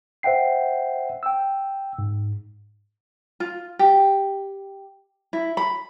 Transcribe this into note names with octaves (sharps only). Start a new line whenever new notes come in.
C5 E5 F#5 G5 C7
G5 E6
G#2
F4
G4
E4
B5